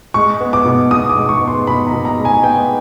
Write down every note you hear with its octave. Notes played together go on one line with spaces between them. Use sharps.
G#3 C#6
B3
D6
B2
B2 D#6
D6
G#3
C#6
B3
C6
B2 B5
A#5
B2
A#5
G#3
G#5
B3 G5